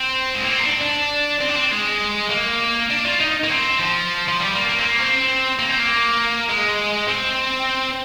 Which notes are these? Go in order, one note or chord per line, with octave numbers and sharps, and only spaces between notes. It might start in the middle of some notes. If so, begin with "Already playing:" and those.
Already playing: C4
G#3
A#3
C4
D#4
D4
D4
C4
D4
C4
G#3
A#3
D4
F4
D#4
A#3
C4
F3
F3
G3
A#3
A#3
C4
A#3
C4
A#3
C4
A#3
G#3
C4